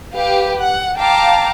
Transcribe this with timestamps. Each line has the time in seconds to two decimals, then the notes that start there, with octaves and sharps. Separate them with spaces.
0.12 G4 B4 F5
0.59 F#5
0.98 F5 G5 A5 A#5 D6